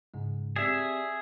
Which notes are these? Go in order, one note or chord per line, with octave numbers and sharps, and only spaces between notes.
G#2 C#3 G#3
C4 G4 G#4 D5 E5